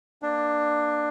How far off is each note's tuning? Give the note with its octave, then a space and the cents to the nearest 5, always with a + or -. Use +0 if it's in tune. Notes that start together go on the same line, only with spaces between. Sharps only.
A#3 +0 D4 +15